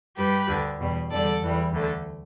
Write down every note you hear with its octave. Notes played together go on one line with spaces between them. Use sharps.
G2 G3 G4 B4
D2 D3 G3
E2 B2 G3
E2 D3 G3 A4 D5
E2 E3 G3
D2 D3 A3